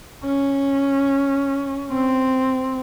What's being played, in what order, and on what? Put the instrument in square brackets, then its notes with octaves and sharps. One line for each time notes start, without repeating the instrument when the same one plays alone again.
[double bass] C#4
C4